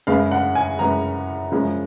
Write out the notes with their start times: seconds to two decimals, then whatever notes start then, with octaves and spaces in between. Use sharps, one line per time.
0.07 F#2 C#3 G#3 B3 F5
0.31 F#5
0.55 G#5
0.79 F#2 C#3 G#3 B3 A#5
1.52 F#2 C#3 F3 G#3